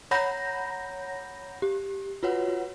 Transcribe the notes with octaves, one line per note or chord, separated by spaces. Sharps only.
C#5 F#5 A#5 B5 G6 A#6
G4
F4 F#4 B4 C#5 F#5